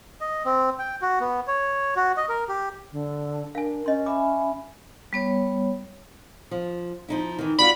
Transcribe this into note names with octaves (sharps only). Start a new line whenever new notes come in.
D#5
C4
G5
F#4
B3
C#5
F#4
D#5
A#4
G4
D3
D4 A#4 F5 G#5
C#4 D#5 C6
E5 G#5 B5 D6
G3 B3 C#5
F3
F3 D#4 E4
D#3 E3
F4 F#4 D5 B5